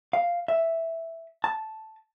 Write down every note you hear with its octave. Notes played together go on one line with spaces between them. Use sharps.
F5
E5
A5